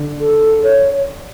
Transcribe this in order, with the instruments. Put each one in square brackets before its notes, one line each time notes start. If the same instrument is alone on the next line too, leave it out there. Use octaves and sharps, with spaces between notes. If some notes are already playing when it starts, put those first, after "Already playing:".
Already playing: [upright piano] D3
[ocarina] A4
C#5